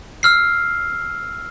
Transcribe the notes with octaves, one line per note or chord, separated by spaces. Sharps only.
E6 F6 C7